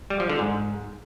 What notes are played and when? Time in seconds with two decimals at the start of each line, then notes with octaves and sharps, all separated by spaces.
0.10 G3
0.20 F3
0.30 D3
0.39 G#2